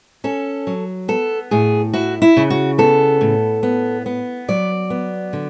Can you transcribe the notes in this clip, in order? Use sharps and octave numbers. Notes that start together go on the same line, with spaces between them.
C#4 A4
F#3
B3 A4
A2 G#4
E4 F#4
E4
C#3
F#4
B3 A4
A2
B3
B3
F#3 D5
B3
D3